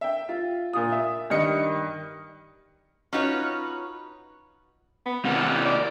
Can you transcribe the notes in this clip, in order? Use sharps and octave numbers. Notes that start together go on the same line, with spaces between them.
E5 G5
F4
A#2 F4 D#6
E5
G2 D#3 D#5 C#7
C#4 D#4 F4 F#4 B4 C#5
B3
C3 A#3 F#5
D5